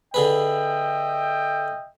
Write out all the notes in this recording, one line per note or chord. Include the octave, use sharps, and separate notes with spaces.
D3 G#4 B4 D#5 E5 G5